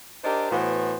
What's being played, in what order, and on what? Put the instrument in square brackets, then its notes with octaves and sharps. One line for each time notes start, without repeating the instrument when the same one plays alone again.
[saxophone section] D4 G4 A#4 C5 D#5
A2 E3 B3 F#4 C5